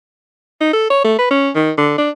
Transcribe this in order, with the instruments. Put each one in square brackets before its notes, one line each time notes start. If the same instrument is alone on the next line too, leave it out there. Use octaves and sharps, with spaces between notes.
[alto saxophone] D#4
A4
C#5
A3
B4
C#4
D#3
D3
D4